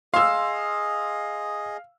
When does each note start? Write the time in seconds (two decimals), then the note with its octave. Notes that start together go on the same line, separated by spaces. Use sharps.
0.14 G#4 D#5 F5 C6 E6